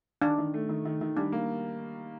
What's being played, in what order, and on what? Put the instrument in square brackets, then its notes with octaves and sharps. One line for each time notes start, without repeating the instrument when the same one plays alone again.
[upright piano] D#3 [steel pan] D4
[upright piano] D#3
A3
D#3
D#3
D#3
[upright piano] G3 [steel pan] D4
[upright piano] A#3